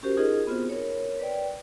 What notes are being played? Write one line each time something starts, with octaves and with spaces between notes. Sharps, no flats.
C#4 F#4 G4 A#4 C5
D#4 F4 G#4 A#4 D#5
B3 C4 F4 F#4 C5
A#4 C#5
B4 D5 G5